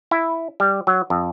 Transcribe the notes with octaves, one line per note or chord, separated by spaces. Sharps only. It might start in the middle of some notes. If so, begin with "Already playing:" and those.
E4
G3
F#3
F2